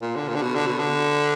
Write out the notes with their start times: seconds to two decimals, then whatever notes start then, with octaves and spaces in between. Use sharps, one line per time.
0.02 A#2
0.16 D3
0.28 A#2
0.35 D3
0.42 B2
0.55 D3
0.66 B2
0.79 D3